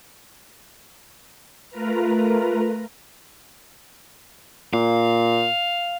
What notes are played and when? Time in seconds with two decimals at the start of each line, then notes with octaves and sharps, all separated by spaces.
1.70 A3 F4 A#4 B4 A#5
4.73 A#2 F5